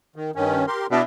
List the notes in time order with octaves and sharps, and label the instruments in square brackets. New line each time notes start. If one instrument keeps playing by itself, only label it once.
[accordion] D#3
G2 D#3 C#4
G4 A#4 C6
[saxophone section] B2 E4 [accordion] D4 D5